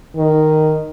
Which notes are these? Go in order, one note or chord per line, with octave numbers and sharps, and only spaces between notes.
D#3